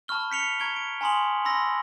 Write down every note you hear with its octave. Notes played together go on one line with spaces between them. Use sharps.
A5 B5 C#6 F6 G7
G6 B6 C#7 F7 G7
A#5 C#6 G#6 D7 G7
D7
G#5 A#5 C6 D#6 F#7
B5 C6 E6 A#6